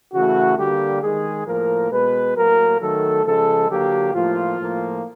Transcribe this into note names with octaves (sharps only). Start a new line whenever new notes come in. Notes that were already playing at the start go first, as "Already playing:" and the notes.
C#3 E3 A3 F#4
D3 G3 A#3 G4
D#3 G#3 G#4
A2 F3 A#3 A#4
B2 G#3 B4
A2 F#3 A#3 A#4
D#3 F#3 A3 A4
C#3 F3 G#3 A4
D3 F#3 A#3 G4
A2 F3 A#3 F4
A2 F3 A#3